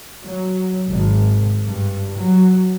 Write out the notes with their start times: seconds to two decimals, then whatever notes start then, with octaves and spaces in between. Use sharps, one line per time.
0.23 F#3
0.88 G#1
1.65 G2
2.15 F#3